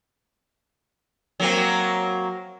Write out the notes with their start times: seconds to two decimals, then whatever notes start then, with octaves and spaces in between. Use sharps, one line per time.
1.40 F#3 A#3 C4